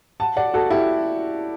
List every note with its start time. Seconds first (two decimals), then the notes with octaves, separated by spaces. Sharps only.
0.20 F#5 A5
0.37 D5 F#5
0.54 F#4 A4
0.70 E4 G4